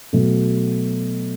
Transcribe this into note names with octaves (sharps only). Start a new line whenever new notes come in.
B2 F#3 A3